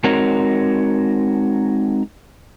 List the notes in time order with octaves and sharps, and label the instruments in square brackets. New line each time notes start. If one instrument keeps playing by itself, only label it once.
[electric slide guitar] G#3 C4 D#4 F#4 A#4 C#5